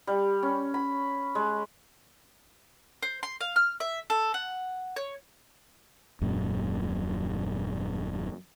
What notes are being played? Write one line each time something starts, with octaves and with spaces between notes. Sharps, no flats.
G3
C#4
B5
G#3
C5
C6
F5
F6
E5
A4
F#5
C#5
D#1 F#2 A#2